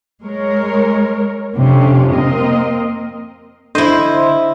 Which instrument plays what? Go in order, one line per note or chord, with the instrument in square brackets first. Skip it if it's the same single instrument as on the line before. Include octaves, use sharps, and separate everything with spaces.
[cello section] G#3 A#4 C#5
F2 C3 C#4 D4
A#3 C4 A#4 D#5
[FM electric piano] D3 C5 [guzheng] E4 D#5